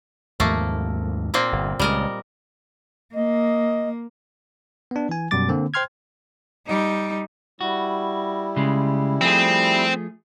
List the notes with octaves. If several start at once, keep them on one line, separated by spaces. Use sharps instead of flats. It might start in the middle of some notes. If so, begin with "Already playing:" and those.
D#2 G#2 F3 A3 A#3
A#2 A#3 C4
G1
C#2 G3 A#4 D#5
A#3 D#5
B3 D4
E3 G#5
F#2 B2 G3 D6 A6
D3 A#3 C4
C5 G5 C6 F6 G#6
G3 D#4
G3 E4 F#4
C#3 G#3
F3 A3 C4 G#4